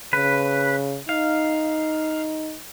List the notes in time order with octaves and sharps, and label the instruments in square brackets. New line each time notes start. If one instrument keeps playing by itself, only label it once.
[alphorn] C#3 [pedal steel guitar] B4
[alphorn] D#4 [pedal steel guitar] F5